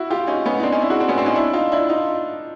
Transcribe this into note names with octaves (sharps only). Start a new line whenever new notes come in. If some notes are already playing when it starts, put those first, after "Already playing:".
Already playing: E4 F#4
F4 G4
C#4 D#4
B3 C#4
D#4
C4 D4
C#4 D#4
D4 E4
F#4 G#4
C4 D4
B3 C#4
C4 D4
C#4 D#4
D4 E4
D#4 F4
D4 E4
D#4 F4